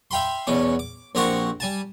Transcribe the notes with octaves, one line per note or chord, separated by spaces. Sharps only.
E5 F5 G5 B5 C6
E2 B2 C#4 D6
D6
A#1 C4 G4 A#4 F#5 C#6
G3 G#5 A5